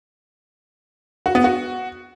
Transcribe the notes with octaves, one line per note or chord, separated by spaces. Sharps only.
F#4
B3
F#4